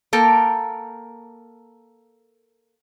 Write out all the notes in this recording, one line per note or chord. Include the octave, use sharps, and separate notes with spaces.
A#3 A4 A#4 G5